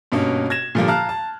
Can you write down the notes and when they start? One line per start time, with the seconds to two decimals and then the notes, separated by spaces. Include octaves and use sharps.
0.12 G2 B2 A#3 C#4
0.50 G#6 A#6 E7
0.75 A#2 D3 F3 G3 A#3
0.88 F5 A5 A#5 F6 F#6
1.09 A5